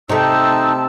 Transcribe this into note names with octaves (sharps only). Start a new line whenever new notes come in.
C3 A3 D#4 A5 E6